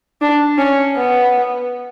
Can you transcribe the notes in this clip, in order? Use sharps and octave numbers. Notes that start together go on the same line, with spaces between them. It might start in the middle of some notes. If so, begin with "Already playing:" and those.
D4
C#4
B3